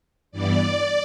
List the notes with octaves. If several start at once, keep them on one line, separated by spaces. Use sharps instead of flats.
G2 E3 B3 D5